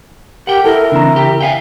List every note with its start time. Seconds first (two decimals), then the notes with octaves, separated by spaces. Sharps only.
0.47 G4 A#4 F#5 G5
0.65 E4 A4 A#4
0.92 C#3 E3 C4 D4 A#5
1.16 G4 G5
1.40 E5 F5 G5 G#5